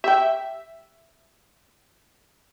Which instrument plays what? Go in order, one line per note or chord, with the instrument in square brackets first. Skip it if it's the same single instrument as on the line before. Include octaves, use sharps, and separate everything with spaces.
[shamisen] G4 G5 [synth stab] E5